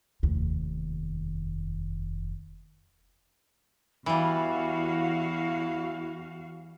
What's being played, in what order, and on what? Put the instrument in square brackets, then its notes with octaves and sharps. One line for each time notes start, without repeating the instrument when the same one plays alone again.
[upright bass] F1 D#2
[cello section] E2 F#4 F5 [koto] E3 G3 [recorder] E4